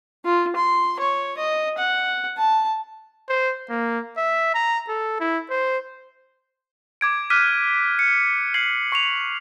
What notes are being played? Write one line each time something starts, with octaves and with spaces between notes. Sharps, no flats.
F4
C6
C#5
D#5
F#5
A5
C5
A#3
E5
A#5
A4
E4
C5
D6 G#6 D7
D6 F6 F#6 B6 D#7
C#7
F6 G#6 C7 F#7
C#6 C#7 F7